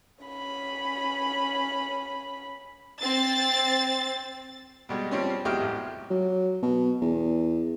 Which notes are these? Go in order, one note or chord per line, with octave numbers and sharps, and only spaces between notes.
C#4 B5
C4 A6
B2 G3 G#3
F3 G3 C4 C#4
E2 F#3 G#3 G4 F6
A1
F#3
B2
E2